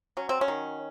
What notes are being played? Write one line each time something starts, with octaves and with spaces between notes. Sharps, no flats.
F#3 C#4
C4
C#4
D#3